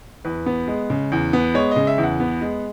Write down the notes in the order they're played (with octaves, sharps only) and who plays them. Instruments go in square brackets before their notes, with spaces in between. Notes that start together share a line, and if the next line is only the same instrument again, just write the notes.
[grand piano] E2 B4
B3
G#3
C#3
E2
B3
G#3 C#5
C#3 D#5
E5
E2
F#5
B3
G#3